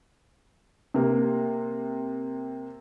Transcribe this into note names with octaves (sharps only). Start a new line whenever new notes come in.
C3 A#3